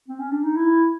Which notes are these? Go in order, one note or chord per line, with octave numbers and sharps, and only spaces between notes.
C4
C#4
D4
D#4
E4